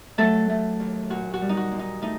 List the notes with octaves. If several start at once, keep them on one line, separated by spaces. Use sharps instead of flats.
F#3 A3 A4
A3
D#2
A#2 F#4
F#4
G3
D#4
F#4
A#2
D#4
A3 D#4